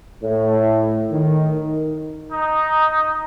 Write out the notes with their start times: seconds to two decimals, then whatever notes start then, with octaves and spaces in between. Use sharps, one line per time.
0.23 A2
1.11 D#3
2.32 D#4